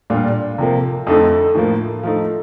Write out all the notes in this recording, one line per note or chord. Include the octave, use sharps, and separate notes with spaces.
A#2 G3 D4 F4
C3 F3 A#3
F2 D3 A3 D#4
A2 F3 A#3
F3 A3 D#4